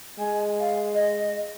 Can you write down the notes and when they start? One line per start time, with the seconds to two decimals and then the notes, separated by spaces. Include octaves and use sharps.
0.19 G#3 G#5
0.60 F5
0.95 D#5